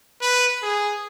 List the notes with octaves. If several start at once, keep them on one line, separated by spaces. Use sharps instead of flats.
B4
G#4